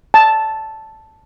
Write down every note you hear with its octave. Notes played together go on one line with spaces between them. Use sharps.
A5